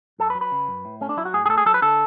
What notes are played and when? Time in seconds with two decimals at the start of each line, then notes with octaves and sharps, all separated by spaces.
0.19 F#2 A4
0.30 B4
0.35 F#3
0.41 B4
0.51 C#3
0.68 F#2
0.85 A2
1.01 A3 C#4
1.09 D4
1.17 F#3 E4
1.25 F#4
1.33 A2 G#4
1.46 G#4
1.49 A3 A4
1.58 G#4
1.66 F#3 A4
1.74 B4
1.82 D3 A4